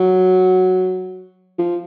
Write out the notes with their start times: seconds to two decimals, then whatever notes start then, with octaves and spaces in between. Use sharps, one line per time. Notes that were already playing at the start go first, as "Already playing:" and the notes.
Already playing: F#3
1.58 F3